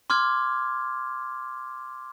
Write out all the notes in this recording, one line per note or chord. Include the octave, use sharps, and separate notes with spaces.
C6 D6 F6 G#6